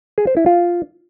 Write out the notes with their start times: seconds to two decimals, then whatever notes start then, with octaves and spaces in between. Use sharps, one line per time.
0.18 G#4
0.27 C5
0.37 E4
0.46 F4